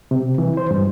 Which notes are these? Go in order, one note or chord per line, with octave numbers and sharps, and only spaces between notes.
C3
E3
C5
G2